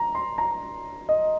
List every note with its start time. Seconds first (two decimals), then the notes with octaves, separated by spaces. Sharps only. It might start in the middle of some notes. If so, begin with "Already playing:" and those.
Already playing: A#5
0.15 C6
0.38 A#5
1.09 D#5